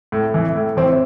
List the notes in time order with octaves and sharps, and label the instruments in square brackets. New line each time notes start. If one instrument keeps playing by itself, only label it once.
[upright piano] A2
E3
A2
E3 C4